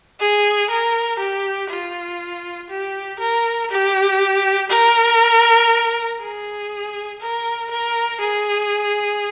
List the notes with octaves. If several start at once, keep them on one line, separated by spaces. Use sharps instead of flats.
G#4
A#4
G4
F4
G4
A#4
G4
A#4
G#4
A#4
A#4
G#4